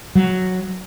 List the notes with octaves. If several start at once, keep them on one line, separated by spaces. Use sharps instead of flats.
F#3